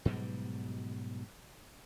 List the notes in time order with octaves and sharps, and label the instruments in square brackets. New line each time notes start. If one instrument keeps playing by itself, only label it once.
[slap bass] G#2 B2 F#3 G3